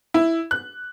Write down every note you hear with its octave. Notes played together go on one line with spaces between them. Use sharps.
E4
F#6